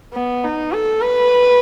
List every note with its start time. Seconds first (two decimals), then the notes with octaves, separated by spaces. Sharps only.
0.14 B3
0.44 D#4
0.72 A4
1.01 B4